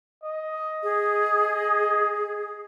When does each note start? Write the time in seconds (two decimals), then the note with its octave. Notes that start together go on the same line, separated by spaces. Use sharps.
0.24 D#5
0.83 G#4